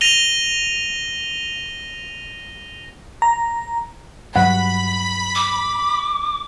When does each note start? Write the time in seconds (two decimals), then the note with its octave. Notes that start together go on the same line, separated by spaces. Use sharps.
0.01 A#6 D#7 F7 G7
3.22 A#5
4.36 G2 F#3 F#5 B5
5.35 D6